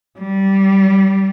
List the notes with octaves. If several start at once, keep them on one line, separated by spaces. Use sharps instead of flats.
G3